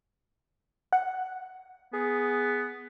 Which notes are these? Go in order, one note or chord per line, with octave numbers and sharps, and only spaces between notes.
F#5
B3 G#4